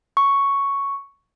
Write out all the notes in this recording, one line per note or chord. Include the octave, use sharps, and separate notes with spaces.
C#6